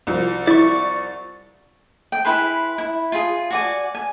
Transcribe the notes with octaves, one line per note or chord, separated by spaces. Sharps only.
C2 F3
E4 D5 C#6
G5
E4 G#4 B4 C6
E4
F4 G#4
F#4 D5 G#5
G#5